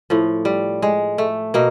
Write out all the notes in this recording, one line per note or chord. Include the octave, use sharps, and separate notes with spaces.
A2 F3
G3
G#3
A3
B2 A#3